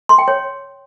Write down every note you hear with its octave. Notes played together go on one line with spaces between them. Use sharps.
C6
G5
C#5